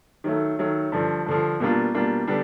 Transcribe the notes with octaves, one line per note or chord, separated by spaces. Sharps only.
D#3 F#3 A3
D#3 F#3 A3
G2 D3 F3
G2 D3 F3
B2 G3 A#3 D4 F4
B2 G3 A#3 D4 F4
D3 G3 B3 D4